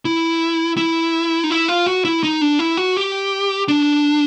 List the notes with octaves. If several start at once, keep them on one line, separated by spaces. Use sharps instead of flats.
E4
E4
D#4
E4
F4
F#4
E4
D#4
D4
E4
F#4
G4
D4